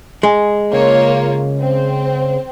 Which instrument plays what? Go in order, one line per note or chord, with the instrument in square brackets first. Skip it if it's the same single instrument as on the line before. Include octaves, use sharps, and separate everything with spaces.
[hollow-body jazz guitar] G#3
[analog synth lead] C#3 [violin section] A#3 F4 C#5
[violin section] C4